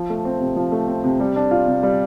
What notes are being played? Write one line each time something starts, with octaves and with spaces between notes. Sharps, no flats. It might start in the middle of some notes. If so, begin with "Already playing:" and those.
Already playing: F3
A3
C4
C3
F3
A3
C4
C3
G3
D4
F4
C3
G3